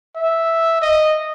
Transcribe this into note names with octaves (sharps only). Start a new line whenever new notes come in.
E5
D#5